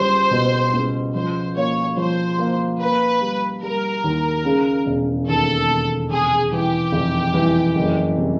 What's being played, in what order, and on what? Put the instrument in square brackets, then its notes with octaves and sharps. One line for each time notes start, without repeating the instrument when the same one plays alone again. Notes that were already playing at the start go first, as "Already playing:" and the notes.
Already playing: [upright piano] C#2 G3 [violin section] C5
[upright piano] B2
C#2
[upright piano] F3 [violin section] C5
[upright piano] A#3 [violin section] C#5
[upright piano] F3 [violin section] C5
[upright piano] A#3
[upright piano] A#3 [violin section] B4
[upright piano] G3
[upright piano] G3 [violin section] A#4
[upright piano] D#2
C#3
E1
[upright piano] D#2 [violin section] A4
[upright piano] E1
[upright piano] C3 [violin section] G#4
[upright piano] E3 [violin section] G4
[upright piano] F1
E3
F#1
C3